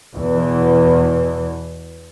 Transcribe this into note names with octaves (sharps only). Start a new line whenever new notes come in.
E2 B2 E3